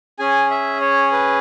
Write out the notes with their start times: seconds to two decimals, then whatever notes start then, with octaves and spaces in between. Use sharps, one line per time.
0.19 C#4 G#4 G#5
0.50 E5
0.81 C#5
1.12 B4